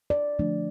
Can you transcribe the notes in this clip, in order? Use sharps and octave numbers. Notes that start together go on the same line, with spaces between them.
D5
D3 F3 A3 D4